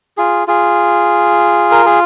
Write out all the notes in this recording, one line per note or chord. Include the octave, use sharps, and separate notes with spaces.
F4 G#4
F4 G#4
A#4
G#4